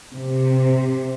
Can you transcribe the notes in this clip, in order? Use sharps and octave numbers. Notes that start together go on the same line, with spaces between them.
C3